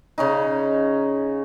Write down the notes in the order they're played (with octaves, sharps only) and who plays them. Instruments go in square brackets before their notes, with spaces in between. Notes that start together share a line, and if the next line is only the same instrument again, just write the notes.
[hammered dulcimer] C#3 C#4 D#4